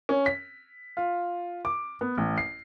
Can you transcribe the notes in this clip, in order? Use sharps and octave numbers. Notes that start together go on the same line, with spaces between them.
C#4
B6
F4
D6
B3
A1
C7